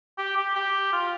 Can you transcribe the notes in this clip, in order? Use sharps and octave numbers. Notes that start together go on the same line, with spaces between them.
G4
G4
G4
F4